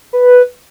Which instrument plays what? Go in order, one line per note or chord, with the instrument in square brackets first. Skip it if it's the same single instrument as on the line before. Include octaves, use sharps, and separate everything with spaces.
[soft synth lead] B4